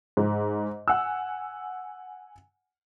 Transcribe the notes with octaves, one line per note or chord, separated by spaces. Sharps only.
G#2
F#5 G#5 E6